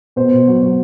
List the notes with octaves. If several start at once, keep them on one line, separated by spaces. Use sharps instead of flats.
B2 C5
B2
F#3
F#3